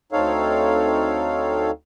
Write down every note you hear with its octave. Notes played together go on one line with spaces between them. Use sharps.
D2 C4 D#4 A4 C#5 F5